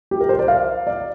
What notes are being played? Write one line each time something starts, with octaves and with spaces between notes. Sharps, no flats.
G4
A#4
C5
D5
F5
D5